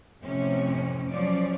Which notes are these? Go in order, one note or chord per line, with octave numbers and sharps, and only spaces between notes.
F2 A2 C3 C#4
F3 F#3 C#4 D5